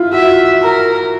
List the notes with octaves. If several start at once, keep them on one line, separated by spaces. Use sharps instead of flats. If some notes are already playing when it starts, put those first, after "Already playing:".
Already playing: E4 F4
F#4 E5
A#4